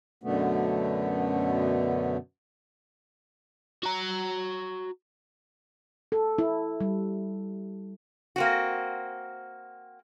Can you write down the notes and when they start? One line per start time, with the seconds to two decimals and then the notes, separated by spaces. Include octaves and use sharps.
0.23 F#2 B2 D3 A3 B3
3.83 F#4 A#5
6.12 A4
6.38 E4
6.81 G3
8.36 A#3 C4 F#4